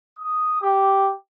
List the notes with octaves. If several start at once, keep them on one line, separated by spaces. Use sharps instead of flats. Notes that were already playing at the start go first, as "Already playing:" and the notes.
D#6
G4